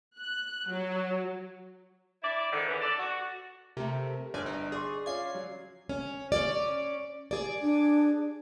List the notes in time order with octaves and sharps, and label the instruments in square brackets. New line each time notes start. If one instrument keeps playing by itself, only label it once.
[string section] F#6
F#3
[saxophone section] E4 D5
G#2 D3 D#3
D3 E3 C#4
A4 D5
F#4
[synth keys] C3 A3 [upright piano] A#4
[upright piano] G1 F6 [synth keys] D5 G#5
[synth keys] D#4
[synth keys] G#4 [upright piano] D5 C6 C#6
[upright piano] C#4 F4 D5 [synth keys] G#6 C7
[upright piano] F#3
[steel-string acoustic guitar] C#4
C#4 D5
G#4 D5
[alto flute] D4